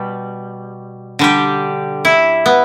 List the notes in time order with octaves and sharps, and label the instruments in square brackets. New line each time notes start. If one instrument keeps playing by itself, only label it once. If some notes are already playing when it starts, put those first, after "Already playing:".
Already playing: [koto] B2 G3
D3 G3 G4
E4
B3